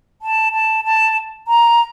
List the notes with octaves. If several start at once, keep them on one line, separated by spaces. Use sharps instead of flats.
A5
A5
A5
A#5